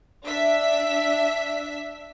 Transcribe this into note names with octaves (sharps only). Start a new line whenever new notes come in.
D4 E5 B6